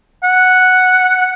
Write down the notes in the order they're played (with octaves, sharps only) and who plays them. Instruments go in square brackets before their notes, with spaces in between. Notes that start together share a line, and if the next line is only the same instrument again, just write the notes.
[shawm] F#5